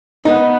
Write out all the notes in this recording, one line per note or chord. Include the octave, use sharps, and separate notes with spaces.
B3 D#4